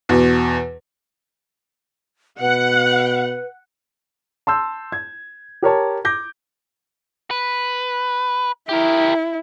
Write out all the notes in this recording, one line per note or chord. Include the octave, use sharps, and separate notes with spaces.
E2 B2
B2 B4 F#5
A5 C6 E6 G6
G#6
G4 A#4 C#5 A5
D6 G6 A#6
B4
E4 G4 A#4